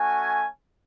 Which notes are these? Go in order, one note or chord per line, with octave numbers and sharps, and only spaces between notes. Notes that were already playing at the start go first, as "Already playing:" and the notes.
Already playing: A3 C#4 F#4 G#5